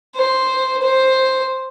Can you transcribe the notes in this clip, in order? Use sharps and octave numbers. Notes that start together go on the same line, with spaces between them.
C5
C5